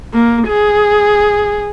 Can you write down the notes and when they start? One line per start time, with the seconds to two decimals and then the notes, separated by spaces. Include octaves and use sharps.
0.14 A#3
0.48 G#4